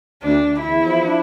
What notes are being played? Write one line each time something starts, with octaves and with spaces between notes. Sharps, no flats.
D2 D4
D2
E2 E4
F3
D4